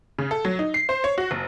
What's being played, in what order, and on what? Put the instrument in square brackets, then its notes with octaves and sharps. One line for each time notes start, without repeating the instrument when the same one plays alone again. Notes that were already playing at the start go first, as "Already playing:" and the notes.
[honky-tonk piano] C#3
A4
F#3
D#4
C7
C5
C#5
F#4
F#1